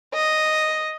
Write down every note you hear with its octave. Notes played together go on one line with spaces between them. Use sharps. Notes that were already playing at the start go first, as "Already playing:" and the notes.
D#5